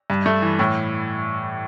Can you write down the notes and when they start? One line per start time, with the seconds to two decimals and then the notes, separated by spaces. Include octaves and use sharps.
0.10 G2
0.26 A3
0.42 E3
0.59 A2